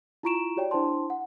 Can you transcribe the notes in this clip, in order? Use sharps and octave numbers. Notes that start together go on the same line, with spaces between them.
E4 F4 A#5 C#6 D7 E7
F#4 G4 C#5 D5 G5
D4 E4 C5 G5 A5 C6
F#5